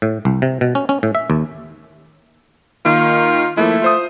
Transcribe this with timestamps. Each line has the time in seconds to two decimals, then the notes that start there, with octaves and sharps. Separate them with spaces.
0.02 A2
0.25 C2
0.42 C3
0.61 B2
0.75 C#4
0.89 C#4
1.03 A2
1.15 E5
1.30 D#2
2.85 D#3 A#3 F4
3.57 F3 A3 A#3 E4
3.82 F4 C5 D#6